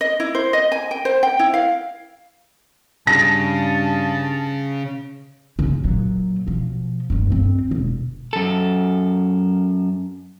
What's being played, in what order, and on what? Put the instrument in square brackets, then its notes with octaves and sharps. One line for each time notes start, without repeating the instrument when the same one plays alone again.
[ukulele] D#5
E4
C5
D#5
G#5
G5
C5
G5
E4
F5
[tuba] G2 [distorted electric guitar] C#3 [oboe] A5 [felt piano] A#6
[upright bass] C#3 F3
A#2 F#3
B2 F3
F1 G2
G2 C4
E1
[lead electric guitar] F#2 A4